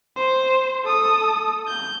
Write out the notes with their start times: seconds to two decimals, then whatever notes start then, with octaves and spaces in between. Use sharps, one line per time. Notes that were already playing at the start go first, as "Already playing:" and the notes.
0.16 C5
0.84 A4 D#6
1.68 G6